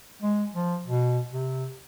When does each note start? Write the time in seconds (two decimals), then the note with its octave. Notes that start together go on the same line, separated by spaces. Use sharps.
0.22 G#3
0.54 F3
0.86 B2
1.33 C3